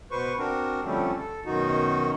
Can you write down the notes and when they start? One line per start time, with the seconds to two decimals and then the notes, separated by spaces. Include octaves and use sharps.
0.11 B2 B4 C5 C#6
0.39 C4 D4 F#4 A#4
0.85 D3 F3 G3 A3 C4 C#4
1.18 A4
1.46 F#2 B2 D#3 D#4 F#4